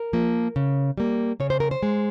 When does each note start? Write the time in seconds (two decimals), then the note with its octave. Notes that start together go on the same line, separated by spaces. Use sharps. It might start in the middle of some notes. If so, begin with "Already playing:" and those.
Already playing: A#4
0.13 F3 A#3
0.56 C#3
0.98 G3 A#3
1.40 C#3 C#5
1.50 C5
1.60 A#4
1.71 C5
1.83 G#3